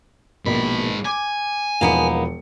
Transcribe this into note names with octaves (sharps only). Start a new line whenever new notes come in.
A#1 G#2 B2 A#4 B5
G#5 D6
E1 F3 A#3 B3 D#4 C#7